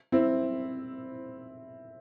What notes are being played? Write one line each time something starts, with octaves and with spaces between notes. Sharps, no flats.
C4 E4